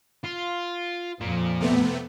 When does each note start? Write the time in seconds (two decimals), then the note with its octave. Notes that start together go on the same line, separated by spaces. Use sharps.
0.24 F4
1.21 F2 A#2 F3
1.60 C3 A3 B3